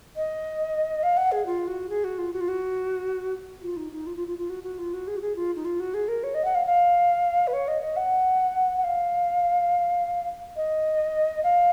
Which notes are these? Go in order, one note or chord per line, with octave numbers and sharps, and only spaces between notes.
D#5
F5
F#5
G#4
F4
F#4
G#4
F#4
F4
F#4
F4
F#4
F4
D#4
D#4
F4
F4
F4
F4
F#4
F#4
F4
F#4
G#4
F#4
G#4
F4
D#4
F4
F#4
G#4
A#4
C#5
D#5
F#5
F5
F5
B4
C#5
D#5
D#5
F#5
F#5
F5
D#5
F5